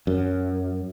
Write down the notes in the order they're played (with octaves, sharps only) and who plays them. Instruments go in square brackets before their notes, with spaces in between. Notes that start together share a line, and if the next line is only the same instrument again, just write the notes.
[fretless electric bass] F#2